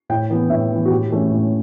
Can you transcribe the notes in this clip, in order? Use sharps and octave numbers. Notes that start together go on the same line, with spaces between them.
A2 G5
E3 B3
A2 E5
E3 B3
F#4
A2 G4
E3 A3 C#4
A2